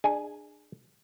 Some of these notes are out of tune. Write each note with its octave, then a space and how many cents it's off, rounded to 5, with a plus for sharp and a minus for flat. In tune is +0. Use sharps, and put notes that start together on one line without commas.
D4 +30 G#4 +0 G#5 +0